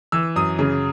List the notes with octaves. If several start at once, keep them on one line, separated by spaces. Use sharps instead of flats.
E3 E6
F#2 D#6
C#3